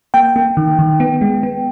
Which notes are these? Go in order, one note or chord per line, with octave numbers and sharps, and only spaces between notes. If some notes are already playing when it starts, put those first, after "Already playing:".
A#3 G5
A#3
D#3
D#3
B3
G#3
B3